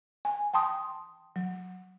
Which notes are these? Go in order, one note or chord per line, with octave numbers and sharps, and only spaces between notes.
G#5
G5 A5 C6 D#6
F#3